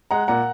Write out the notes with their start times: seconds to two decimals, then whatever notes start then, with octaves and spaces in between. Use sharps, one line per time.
0.11 G#3 F#5 A#5
0.28 A#2 F#5 A#5